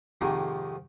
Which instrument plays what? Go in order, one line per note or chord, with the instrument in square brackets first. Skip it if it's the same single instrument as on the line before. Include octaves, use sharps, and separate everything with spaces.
[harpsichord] F2 G#2 C3 D#3 A3 A#3